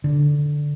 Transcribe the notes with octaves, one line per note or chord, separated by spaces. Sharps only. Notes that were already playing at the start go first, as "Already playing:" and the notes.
D3